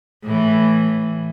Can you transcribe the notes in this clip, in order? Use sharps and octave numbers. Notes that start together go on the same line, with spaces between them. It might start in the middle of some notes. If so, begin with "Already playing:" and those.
A2 E3